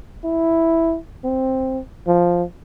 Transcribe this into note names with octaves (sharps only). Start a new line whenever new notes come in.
E4
C4
F3